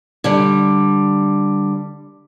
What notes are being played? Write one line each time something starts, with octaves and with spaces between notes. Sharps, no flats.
D3 G3